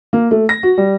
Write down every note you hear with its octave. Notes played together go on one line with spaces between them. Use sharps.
A#3
A3
A#6
F#4
G3